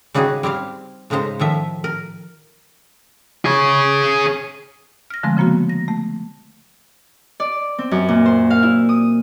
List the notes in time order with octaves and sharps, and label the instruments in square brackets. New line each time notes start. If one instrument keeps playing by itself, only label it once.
[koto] C#3 G3 D#4 F#4 G#4
G3 C4 G4 F5
A2 C#3 G#3 D#4 C5
A2 D#3 F3 E5
A#4
[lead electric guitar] G#4 C#5
[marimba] F6 A#6
D3 F3 G#3 A3 C4
C#3 F3 A#3 B3 F#4
A#6
A3
[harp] D5
C4
F#2
A#2
C5
F5
E4
D#6